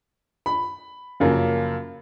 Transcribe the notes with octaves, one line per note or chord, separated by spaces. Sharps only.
B5
F#2 C#3 F3 A#3